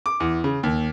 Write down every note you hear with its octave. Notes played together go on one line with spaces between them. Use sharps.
D6
E2
C#3
D#2